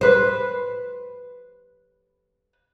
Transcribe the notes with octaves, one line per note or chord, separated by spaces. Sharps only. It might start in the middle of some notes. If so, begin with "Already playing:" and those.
B4 C5